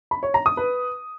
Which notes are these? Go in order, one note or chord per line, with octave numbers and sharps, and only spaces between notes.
B5
C#5
A#5
D#6
B4